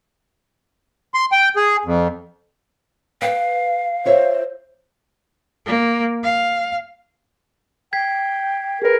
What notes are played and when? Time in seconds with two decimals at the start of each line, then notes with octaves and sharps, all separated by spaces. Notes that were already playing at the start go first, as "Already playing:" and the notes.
1.14 C6
1.32 G5
1.56 G#4
1.85 F2
3.22 B4 F5 G5
4.05 F4 C5 C#5 E5
5.66 A#3
6.23 F5
7.93 G5 G#6 B6 C7
8.82 G#4 A#4 B4